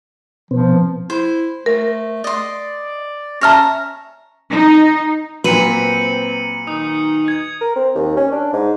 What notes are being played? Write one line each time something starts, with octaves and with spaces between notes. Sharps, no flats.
B2 F3 B3 C4
E4 C5
A3 A#4
D5 D#5 C6
C#4 C#5 E5 A5 A#5 F6 A#6
D#4
A#2 F#3 C4 B4 C#7 D#7 F#7
D#3 D#4 D#6
G#6
A#4
C4
D#2
C#4
D4
G#2